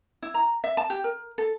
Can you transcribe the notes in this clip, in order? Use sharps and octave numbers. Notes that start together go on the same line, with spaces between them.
E4
A#5
E5
A5
G4
A#4
A4